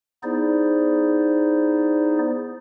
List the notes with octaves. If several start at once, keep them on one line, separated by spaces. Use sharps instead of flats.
B3 D#4 E4 G#4 C5 D5